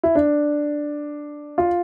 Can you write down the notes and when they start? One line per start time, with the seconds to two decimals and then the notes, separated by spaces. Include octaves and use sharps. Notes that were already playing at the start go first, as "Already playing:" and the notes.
0.03 E4
0.15 D4
1.58 F4